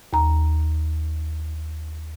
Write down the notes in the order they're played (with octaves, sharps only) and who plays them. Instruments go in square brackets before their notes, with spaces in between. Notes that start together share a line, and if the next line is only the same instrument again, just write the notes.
[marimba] D#2 A#5